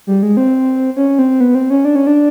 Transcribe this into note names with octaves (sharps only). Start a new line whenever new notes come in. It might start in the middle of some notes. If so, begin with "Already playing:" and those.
G3
G#3
C4
C#4
C4
B3
C4
C#4
D4
C#4
D4